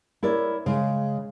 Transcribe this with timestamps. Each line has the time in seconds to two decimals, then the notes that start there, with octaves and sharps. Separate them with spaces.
0.23 E4 A#4 C#5 D5
0.66 C#3 G#3